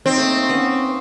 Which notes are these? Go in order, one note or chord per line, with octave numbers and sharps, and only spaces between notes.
C4 D#4 C#5
A3 A#3 D#4
A#3 B3 C#4